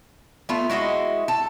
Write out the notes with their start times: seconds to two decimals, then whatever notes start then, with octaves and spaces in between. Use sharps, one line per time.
0.49 A3 B3 F4
0.70 G#3 E4 F#4 D#5
1.28 A4